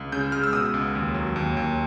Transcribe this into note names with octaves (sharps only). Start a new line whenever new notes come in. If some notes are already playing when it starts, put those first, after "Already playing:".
Already playing: C#2
C#3 G6
G#3 F6
E6
B2 D#6
C#2
D#2
F#3
D#2
D#2